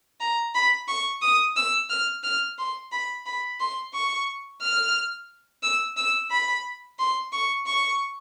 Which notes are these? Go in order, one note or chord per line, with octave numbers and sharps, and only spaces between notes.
A#5
B5
C#6
D#6
E6
F6
F6
C6
B5
B5
C6
C#6
F6
E6
E6
B5
C6
C#6
C#6